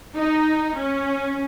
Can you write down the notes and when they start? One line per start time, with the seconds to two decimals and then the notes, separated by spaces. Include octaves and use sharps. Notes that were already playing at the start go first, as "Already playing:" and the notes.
0.16 D#4
0.77 C#4